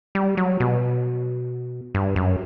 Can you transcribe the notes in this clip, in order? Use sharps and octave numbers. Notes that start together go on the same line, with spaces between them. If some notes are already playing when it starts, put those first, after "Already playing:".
G3
F#3
B2
G2
F#2